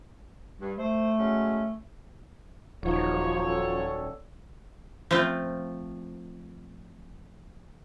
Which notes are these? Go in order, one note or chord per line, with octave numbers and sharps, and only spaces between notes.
G2
A3 C5
F#3 G#3 C#4
D#1 E2 G#2 F3 F#3 D#4 C#5
C#4 D4 A4
F3 A3 C4 F4